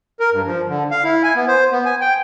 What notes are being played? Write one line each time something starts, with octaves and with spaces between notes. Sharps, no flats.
A#4
G2
F3
D3
F5
E4
G#5
B3
C5
B3
G#5
G5